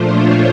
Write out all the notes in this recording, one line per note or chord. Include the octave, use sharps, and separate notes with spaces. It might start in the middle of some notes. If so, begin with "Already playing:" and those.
Already playing: A#2 F3 A3 D4 F4 C5
C#5